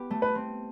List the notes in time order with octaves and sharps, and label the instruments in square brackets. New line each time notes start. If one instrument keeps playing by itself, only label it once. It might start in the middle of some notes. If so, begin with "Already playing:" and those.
Already playing: [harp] B3 G4
A3
[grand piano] B4
[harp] C4